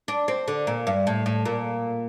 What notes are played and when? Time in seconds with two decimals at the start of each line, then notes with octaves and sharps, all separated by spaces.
0.08 D4
0.28 C4
0.48 D3
0.67 A#2
0.87 G2
1.07 A2
1.26 A2
1.45 A#2